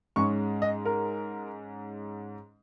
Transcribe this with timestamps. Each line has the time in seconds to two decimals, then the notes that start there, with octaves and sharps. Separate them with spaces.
0.16 G#2 G#3 C#4 C#6
0.62 D#5
0.85 A#4